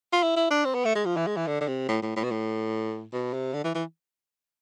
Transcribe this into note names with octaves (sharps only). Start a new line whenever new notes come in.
F4
E4
E4
D4
C4
B3
A3
G#3
F3
E3
G#3
E3
D3
D3
C3
A2
A2
A2
B2
A2
B2
C3
D3
E3
E3